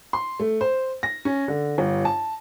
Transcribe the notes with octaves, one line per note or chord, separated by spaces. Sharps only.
C6
A3
C5
A#6
C#4
D3
G1
A5